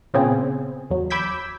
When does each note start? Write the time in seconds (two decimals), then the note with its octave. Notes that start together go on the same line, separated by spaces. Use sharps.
0.14 A#2 C#3 B3 C4 G#4
0.90 E2 F#3
1.10 B5 D6 E6 G6 G#6 B6